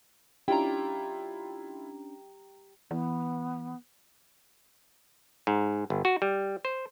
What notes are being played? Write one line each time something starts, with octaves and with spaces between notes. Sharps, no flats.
C#4 D4 E4 F4 G4 G5 A#5
E3 B3
G#2
G1
F#4
G3
C5